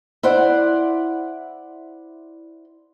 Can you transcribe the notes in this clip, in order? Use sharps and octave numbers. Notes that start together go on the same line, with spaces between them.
E4 C5 D5 F#5